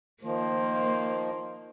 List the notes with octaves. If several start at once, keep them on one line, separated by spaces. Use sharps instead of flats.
D#3 F3 A#3 C5